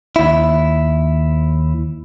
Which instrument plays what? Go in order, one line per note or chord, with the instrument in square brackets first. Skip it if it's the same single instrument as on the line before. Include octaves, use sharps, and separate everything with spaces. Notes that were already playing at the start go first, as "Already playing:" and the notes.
[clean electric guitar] D#2 E4